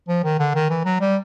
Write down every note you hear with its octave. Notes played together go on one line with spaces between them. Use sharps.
F3
D#3
D3
D#3
E3
F#3
G3